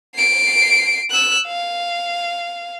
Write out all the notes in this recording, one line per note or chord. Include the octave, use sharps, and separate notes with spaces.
C7 D7
E6 F#6
F5